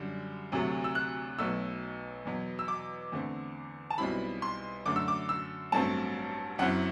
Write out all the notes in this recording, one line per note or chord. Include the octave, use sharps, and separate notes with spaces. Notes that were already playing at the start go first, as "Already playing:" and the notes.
Already playing: F#2 D3 G3
D2 C3 F#3 A3
E6
F#6
B1 B2 F#3 A3 E6
E2 B2 F#3
E6
D6
E2 D3 A3 C4
A5
B1 B2 G3 C4 E4 B5
C6
F#2 D3 A3 D6
E6
D6
E6
A1 G2 F#3 A3 C4 A5
F#1 F#2 F#3 C4 E4 F#5